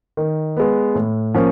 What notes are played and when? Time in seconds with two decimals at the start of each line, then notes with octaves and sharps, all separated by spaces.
0.17 D#3
0.57 G#3 B3
0.95 A2
1.34 F3 A#3 C#4